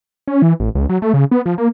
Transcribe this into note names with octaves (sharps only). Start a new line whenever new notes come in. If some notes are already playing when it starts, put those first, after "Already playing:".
C#4
E3
A1
C#2
F#3
A3
C#3
B3
F3
A#3